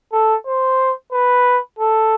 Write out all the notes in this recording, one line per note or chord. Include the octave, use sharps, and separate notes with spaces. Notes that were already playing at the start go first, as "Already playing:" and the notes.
A4
C5
B4
A4